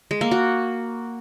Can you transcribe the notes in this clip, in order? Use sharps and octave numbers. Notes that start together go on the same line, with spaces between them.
G#3
A#3
F#4